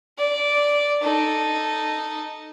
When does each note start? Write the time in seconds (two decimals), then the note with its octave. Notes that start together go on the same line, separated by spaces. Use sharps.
0.18 D5
1.02 D#4 A4